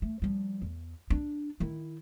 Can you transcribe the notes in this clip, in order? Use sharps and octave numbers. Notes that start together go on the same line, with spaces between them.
A3
F3 G3
E2
D4
D#3 E4